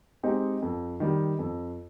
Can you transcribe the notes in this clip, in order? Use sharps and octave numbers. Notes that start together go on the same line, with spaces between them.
G#3 C4 D#4 G4
F2
D#3 G3
F2